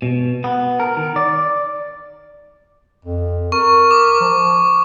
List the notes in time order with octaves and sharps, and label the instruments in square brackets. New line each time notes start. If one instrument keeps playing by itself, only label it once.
[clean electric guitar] B2
B3
A#4
D#3
D5
[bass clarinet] F2
[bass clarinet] A#4 [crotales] C#6
[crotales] D6
[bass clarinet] F3